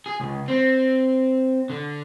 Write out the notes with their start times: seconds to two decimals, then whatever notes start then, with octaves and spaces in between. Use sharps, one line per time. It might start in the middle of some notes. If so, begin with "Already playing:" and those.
0.06 G#4
0.20 C#2
0.48 C4
1.70 D3